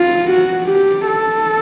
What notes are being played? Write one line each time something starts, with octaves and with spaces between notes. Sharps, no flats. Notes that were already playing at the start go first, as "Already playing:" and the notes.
Already playing: F4
F#4
G4
A4